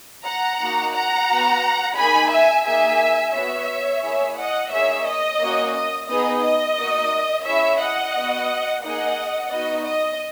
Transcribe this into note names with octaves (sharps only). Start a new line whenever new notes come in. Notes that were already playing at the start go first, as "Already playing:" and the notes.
F#5 A#5
A#3 D#4 F#4
F#5 A#5
B3 F#4
A#3 D#4 G#4 G#5 B5
E5 G#5
A#3 D#4 G#4 E5 G#5
B3 F#4 C#5 E5
A#3 E4 G#4
D#5 F#5
A#3 D#4 G#4 C#5 E5
D#5
A#3 C#4 F#4
D#5
B3 D#4 G#4 D#5
D#5
A#3 D#4 F#4
C#4 E4 G#4 C#5 E5
D#5 F#5
B3 F#4
A#3 D#4 G#4 D#5 F#5
B3 D#4 F#4 D#5
D#5